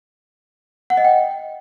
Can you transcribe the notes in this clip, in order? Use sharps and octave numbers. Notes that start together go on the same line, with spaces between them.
F#5
D#5
G5